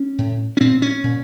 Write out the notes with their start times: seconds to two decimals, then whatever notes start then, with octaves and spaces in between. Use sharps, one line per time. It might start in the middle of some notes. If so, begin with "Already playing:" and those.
Already playing: C#4
0.18 A2
0.57 C#4
0.60 A#2 C4
0.82 C#4
1.04 A#2